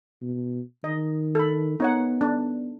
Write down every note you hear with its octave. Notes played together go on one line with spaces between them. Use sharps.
B2
D#3 D#5
A4 B5
B3 D#4 C#5 F#5
D4